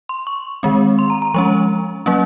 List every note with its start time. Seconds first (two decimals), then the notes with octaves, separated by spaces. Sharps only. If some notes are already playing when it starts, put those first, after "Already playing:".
0.09 C6
0.27 C#6
0.63 D#3 G#3 C4
0.99 C6
1.10 A#5
1.22 A#5
1.34 F3 G#3 C#4 C#6
2.06 F#3 A#3 C#4